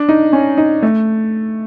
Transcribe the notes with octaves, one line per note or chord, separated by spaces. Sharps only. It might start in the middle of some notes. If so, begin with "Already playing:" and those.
Already playing: D4
D#4
C#4
D#4
A3